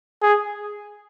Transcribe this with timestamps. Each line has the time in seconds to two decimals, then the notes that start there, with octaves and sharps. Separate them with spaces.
0.22 G#4